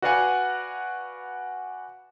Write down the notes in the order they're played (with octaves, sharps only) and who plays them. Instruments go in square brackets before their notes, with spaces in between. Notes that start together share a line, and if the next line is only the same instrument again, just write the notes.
[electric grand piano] F#4 B4 D5 F5 F#5 G#5